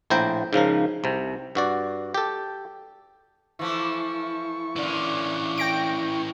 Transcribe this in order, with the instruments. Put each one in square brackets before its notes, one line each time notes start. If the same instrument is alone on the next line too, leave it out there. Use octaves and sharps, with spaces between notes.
[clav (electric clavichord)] A#1 A2 E4 C5 G5 A#5
G#2 C#3 F3 A#4
C2 C3
G2 F#4 D5
G4 A4
[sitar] E3 F3 A3 [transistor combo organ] E4 C#6
[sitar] A#2 D3 [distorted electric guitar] E3 C#4
[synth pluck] G5 A#6 D7